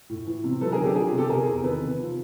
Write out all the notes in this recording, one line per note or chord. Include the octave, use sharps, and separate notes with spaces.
A2
E3
C3
F#3 A4 B4
G#4 A#4
D3
G4 A4
F3 G#4
G4
C3
G4 A4
C3 G#4 A#4
E2
D#3 A4 B4
C3
F3